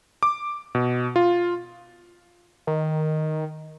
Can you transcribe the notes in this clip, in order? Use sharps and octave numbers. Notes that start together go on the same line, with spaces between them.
D6
B2
F4
D#3